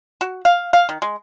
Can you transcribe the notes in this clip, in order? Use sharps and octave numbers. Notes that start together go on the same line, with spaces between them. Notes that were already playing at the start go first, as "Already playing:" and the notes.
F#4
F5
F5
D#3
G#3